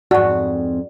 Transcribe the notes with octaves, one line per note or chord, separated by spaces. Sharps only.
F2 G#2 F#4 D5